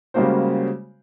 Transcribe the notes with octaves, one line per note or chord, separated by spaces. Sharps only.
C#3 G3 G#3 A#3 F#4 C5